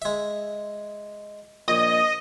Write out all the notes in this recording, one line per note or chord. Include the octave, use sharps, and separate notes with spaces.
G#3 E5
A#1 D#5